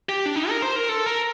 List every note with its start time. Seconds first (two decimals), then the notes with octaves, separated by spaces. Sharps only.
0.09 G4
0.26 D4
0.36 D#4
0.49 A#4
0.62 C5
0.76 A#4
0.89 A4
1.06 A#4